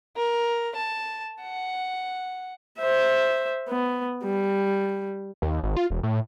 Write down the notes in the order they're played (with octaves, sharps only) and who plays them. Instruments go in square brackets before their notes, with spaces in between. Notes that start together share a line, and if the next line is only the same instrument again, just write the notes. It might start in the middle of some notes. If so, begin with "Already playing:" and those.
[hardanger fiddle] A#4
A5
F#5
[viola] C5 E5
B3
G3
[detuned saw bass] D#2
G#1
F4
E1
A2